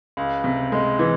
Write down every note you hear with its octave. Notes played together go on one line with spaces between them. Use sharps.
C#2
C3
G#3
E3